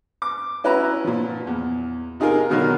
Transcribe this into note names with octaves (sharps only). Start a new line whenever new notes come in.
D6
C#4 E4 F#4 B4 A#5
A#2 F3
E2
C3 D#4 F4 G#4 A#4
B2 D3 D#3 F#3 F5